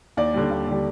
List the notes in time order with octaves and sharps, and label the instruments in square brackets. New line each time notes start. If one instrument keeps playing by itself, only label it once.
[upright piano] D#2 D5
D3 G3
D#2
D3 G3